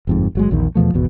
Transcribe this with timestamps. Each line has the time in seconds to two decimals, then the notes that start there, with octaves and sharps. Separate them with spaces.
0.07 G1 F2 G#2
0.35 G1 F#3 G#3
0.51 A#1 E2 D#3
0.75 E2 B2 F3 A3
0.94 G#1 E2 B2